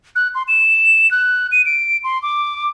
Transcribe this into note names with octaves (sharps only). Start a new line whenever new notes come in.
F#6
C6
E7
F#6
D#7
D7
C6
D6